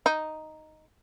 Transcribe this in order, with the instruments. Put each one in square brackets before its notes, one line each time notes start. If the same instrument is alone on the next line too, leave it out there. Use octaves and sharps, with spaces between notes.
[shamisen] D#4